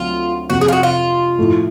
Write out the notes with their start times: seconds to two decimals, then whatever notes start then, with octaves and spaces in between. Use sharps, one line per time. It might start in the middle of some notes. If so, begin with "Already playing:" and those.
Already playing: D2 D3 F#3 A3 C4 F4
0.50 F2 C3 F3 F#4
0.61 G#4
0.68 F4
0.73 F#4
0.83 F4
1.38 A2 F3 A3